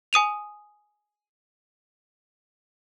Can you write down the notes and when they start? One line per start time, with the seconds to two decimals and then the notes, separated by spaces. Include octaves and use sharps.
0.13 G#5 D#6 D#7 F7